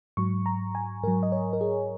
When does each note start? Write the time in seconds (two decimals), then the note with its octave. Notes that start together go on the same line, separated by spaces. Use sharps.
0.17 G#2 F#3 C#6
0.46 A#5
0.75 G#5
1.03 G#2 F#3 A#4
1.23 D#5
1.32 C#5
1.53 A#4
1.61 G#4